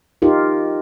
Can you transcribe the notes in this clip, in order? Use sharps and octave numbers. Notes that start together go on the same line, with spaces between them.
D#4 F4 G4 A#4